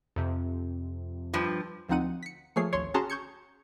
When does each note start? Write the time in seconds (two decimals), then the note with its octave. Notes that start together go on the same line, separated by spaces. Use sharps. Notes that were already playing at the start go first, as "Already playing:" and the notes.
0.16 F2 C3
1.34 G2 F3
1.88 D2 F3 C4 D#4 F#5 D#7
2.23 B6 C#7
2.56 F3 A3 A#3 G#4 C#5 C7
2.72 G#1 D2 C#5 C6
2.94 C#4 F#4 G#4 A5 A#5 C6
3.10 C#6 G6 G#6 C#7